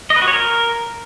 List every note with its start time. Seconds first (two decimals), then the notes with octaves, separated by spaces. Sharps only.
0.10 D#5
0.16 B4
0.22 F#4
0.28 C#5
0.33 A#4